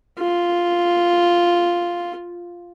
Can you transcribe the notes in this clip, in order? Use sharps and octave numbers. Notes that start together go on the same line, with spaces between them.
F4